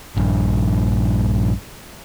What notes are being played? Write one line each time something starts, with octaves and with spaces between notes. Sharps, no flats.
A#1 G2